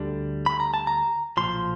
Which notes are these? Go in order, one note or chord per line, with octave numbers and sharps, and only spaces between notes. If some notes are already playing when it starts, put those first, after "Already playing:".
Already playing: D2 D3 G3
B5
A#5
A5
A#5
B1 A#2 F3 C6